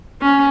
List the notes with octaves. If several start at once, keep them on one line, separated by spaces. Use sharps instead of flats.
C#4